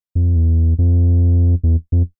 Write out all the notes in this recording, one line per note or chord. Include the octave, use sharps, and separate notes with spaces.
F2
E2
F2
E2
F2